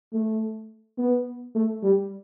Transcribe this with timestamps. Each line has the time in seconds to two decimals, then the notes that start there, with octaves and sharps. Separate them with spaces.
0.13 A3
0.98 B3
1.55 A3
1.83 G3